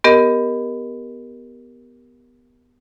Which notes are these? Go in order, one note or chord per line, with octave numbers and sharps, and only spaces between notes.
B3 G4 A#4 D#5